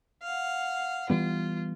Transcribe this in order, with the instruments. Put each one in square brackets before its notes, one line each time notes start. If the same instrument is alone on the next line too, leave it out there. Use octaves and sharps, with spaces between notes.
[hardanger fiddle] F5 F#5
[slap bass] E3 G3 B3 [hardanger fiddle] F4